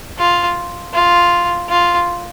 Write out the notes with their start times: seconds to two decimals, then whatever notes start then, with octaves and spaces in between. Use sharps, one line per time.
0.19 F4
0.94 F4
1.70 F4